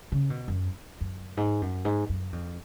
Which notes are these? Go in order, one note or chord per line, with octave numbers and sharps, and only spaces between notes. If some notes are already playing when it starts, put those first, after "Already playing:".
C#3
B2
F#2
F#2
G#2
F#2
G#2
F#2
F2